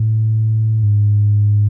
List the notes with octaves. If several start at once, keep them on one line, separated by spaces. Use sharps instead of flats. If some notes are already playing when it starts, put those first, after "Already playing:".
Already playing: A2
G#2